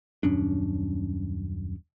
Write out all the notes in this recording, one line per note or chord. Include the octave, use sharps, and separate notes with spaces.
D#1 F#2 C#4 D4